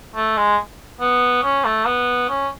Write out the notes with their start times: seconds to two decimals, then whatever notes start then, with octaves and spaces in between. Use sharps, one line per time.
0.16 A3
0.37 G#3
1.00 B3
1.43 C#4
1.65 A3
1.86 B3
2.29 C#4